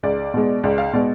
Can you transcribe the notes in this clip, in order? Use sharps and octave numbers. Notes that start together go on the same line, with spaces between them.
C#2 D5
B2 G#3
C#2 D5
F5
B2 G#3 D5